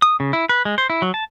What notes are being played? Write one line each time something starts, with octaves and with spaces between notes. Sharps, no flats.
D#6
C#3
E4
B4
G#3
C5
E4
F#3
A5